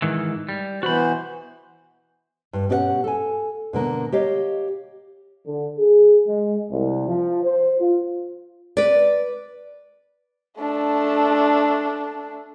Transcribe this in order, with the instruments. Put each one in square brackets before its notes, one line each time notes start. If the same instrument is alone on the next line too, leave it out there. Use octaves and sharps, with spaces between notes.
[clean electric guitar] G#2 D#3 E3
G3
[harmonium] B2 E3 C5 [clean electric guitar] F#4 B5
[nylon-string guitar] G2
B2 C#4 G4 D5 F#5
A4 G#5
B2 D3 A#3
G4 C#5 D#5 F5
[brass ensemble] D3
G#4
G#3
C2
F3
C5
F4
[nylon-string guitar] B4 D5
[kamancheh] A3 D4